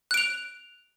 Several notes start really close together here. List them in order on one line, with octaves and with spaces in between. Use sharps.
F#6 D7 F7